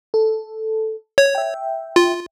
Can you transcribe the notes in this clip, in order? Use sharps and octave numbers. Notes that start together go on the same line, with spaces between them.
A4
C#5
E5 G5
F4